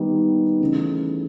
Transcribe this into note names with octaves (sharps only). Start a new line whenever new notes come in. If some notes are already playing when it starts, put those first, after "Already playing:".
Already playing: D#3 G3 B3 D#4
C#3 E3 A3